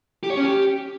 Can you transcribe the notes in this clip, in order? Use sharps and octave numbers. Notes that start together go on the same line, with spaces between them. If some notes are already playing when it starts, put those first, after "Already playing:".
G4
C#5
C#4
G4